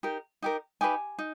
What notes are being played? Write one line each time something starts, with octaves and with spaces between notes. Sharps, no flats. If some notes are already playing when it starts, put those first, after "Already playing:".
D#4 G4 A#4
D#4 G4 A#4
D#4 G4 B4 G#5
D#4